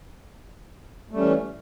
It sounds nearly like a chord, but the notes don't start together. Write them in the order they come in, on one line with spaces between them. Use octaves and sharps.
A3 G3 C#4 E3